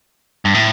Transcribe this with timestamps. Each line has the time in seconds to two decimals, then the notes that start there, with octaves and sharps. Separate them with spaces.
0.45 G2
0.54 A2